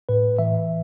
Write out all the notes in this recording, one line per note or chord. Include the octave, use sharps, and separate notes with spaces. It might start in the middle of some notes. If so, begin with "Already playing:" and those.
A2 B4
E3 E5